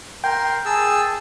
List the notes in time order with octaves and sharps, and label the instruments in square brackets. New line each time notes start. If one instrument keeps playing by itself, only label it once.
[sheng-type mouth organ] A#4 C6 [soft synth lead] G5
[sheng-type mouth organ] G#4 A5 E6